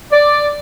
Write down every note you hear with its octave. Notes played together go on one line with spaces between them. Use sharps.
D5